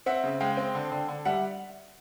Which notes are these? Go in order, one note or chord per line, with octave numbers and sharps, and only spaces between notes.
C4 E5 F#5
C#3
G#3 F5 G5
C4
D3
D3
D3
G3 E5 F#5